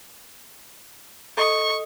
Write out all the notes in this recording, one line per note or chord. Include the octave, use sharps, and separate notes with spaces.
A4 D#5 C#6 D#6